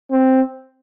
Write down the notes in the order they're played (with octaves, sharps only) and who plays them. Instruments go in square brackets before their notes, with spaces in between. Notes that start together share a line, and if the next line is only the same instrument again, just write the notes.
[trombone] C4